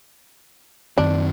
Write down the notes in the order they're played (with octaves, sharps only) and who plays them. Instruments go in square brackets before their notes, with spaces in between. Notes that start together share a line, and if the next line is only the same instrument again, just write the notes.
[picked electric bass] F#2 D#3 C4 [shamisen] D4